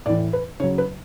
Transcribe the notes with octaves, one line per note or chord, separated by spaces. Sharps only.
A2 E3 D5
B4
C#3 F#3 C#5
B4